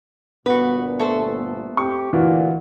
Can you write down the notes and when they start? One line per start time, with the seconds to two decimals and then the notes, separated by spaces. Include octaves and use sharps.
0.46 G1 A#2 B3 F#4 B4
0.99 A3 A4 C5
1.77 C4 G4 C#6
2.13 D2 A#2 E3 F4 F#4